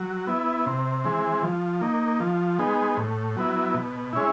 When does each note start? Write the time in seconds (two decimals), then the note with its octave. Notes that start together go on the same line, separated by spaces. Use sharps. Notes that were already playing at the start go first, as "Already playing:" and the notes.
Already playing: F#3
0.27 B3 E4
0.66 C3
1.04 E3 G#3 C4
1.43 F3
1.81 A#3 D#4
2.20 F3
2.59 G#3 B3 D#4
2.97 A2
3.37 F#3 B3 E4
3.74 B2
4.13 G#3 C#4 E4